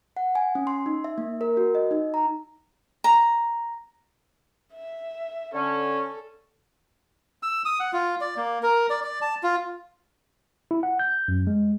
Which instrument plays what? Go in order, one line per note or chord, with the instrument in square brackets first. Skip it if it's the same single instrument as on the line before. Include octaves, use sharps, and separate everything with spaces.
[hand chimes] F#5
G#5
C#4
C6
D#4
E5
A#3
A#4
F#4
D#5
D#4
A#5
[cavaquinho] A#5
[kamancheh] E5
[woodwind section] D3 C#4 [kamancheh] A4
[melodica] E6
D#6
F#5
F4
D5
A#3
A#4
D5
D5
A5
F4
[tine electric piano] E4
F#5
G6
F#2
G#3